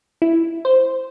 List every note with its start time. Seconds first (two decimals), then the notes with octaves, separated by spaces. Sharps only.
0.22 E4
0.65 C5